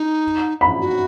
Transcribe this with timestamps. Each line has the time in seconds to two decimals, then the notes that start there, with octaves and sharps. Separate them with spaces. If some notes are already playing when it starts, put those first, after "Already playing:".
Already playing: D#4
0.61 B5
0.80 F#4